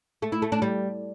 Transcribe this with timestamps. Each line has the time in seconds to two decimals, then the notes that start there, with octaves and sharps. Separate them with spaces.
0.22 A3
0.32 E4
0.42 A3
0.52 D4
0.62 G3